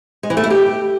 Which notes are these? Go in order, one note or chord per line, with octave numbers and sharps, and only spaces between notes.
G#3
E3
A3
E4
G4